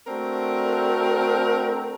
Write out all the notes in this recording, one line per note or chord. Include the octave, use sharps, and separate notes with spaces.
A3 C4 D4 F#4 A#4